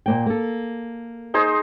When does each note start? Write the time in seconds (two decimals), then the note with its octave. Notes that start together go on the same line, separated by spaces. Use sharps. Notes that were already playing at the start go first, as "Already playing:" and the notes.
0.06 A#2 A#3 G5
0.26 A#3 A4
1.34 D#4 G#4 C5